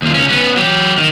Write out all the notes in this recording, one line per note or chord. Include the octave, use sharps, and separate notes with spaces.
D#2 F4
C#2 C#4
B3 C#4
F#3 G4
D#3